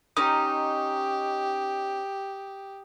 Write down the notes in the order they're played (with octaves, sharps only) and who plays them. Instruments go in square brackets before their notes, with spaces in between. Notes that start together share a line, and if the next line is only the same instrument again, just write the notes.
[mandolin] C#4 D#4 D#5 [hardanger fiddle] G4 [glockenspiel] D#6